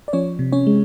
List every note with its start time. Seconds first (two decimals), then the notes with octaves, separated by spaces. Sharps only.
0.08 D5
0.13 F3 C#4 C#5
0.39 C3
0.52 C#4 C#5
0.67 G#3